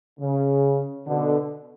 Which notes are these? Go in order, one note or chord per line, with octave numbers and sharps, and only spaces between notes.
C#3
B2 D3